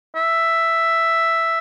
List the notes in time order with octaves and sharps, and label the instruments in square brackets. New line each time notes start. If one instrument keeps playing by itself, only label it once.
[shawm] E5